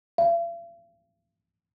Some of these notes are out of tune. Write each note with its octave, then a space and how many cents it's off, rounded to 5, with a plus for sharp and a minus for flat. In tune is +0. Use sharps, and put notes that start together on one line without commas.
F5 -45